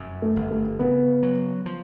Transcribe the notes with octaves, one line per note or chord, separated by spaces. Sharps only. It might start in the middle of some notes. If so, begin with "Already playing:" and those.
Already playing: F1 F#2
A3
G1
A3
C#3 B3
F#3
F3